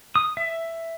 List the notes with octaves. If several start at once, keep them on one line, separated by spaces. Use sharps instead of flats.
D#6
E5